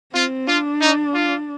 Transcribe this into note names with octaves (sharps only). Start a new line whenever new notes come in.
C4 F4
D4 F4
D#4
F4